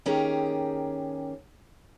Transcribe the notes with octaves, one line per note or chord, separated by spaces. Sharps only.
D#3 A#3 C#4 G4 G#4 A#4